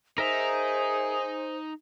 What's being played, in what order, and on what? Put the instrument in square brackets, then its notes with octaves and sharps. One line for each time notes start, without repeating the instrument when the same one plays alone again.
[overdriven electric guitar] D#4 [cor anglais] G#4 [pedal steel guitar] A#4 E5 A#5 [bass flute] C5